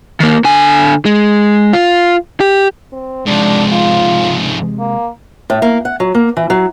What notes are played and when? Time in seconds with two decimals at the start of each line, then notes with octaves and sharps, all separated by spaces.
0.20 D#3 A#3
0.45 D3 G#5
1.05 G#3
1.73 F4
2.40 G4
2.92 C4
3.27 G#2 C3 F3 G#3 D4
3.72 F4
4.79 A#3
5.50 A2
5.62 A#3
5.85 F#5
6.00 F#3
6.15 A#3
6.37 E3
6.50 F#3